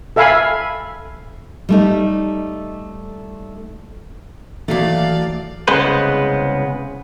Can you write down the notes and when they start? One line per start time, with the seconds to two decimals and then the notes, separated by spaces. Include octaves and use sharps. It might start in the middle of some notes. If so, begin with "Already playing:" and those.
0.16 A4 E5 F5 G#5 B5
1.69 G3 A3 D#4
4.68 D#2 E3 F#3 A3 D5 F5
5.68 C2 C#3 G#3 B3 B4 C5